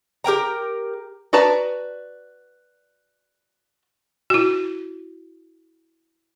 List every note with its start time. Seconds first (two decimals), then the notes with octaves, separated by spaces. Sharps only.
0.24 G4 A#4 G5 A#5
1.33 F#4 B4 D5 A5 A#5
4.30 E4 F#4